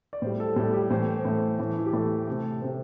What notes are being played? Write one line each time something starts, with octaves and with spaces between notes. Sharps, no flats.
D5
A2 G3 C5
A4
A2 G3 A4
G4
A2 E3 A3 C5
C5
A2 E3 A3 C5
A2 E3 A3
E4
G4
A2 E3 A3 A4
C3 A3
C3 A3 C5